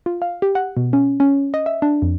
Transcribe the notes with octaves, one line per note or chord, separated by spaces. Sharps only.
F4
F5
G4
F#5
B2
C#4
C#4
D#5
E5
D4
F2